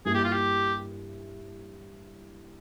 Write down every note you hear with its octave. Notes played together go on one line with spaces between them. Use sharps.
G2 G3 A#3 E4 G#4
G4
F4
G4